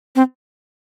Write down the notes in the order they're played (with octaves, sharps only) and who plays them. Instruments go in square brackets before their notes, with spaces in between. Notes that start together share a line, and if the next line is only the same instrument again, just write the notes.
[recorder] C4